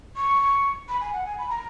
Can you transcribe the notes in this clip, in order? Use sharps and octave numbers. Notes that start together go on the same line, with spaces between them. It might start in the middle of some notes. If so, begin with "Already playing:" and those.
C#6
B5
G#5
F#5
G#5
B5
A#5